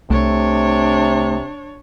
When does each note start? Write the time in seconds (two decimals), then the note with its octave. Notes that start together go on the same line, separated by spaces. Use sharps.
0.10 C2 C3 A3 D4 C#5